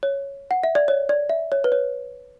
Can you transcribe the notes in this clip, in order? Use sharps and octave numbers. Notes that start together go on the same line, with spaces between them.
C#5
F#5
E5
D5
C#5
D5
E5
C#5
B4
C#5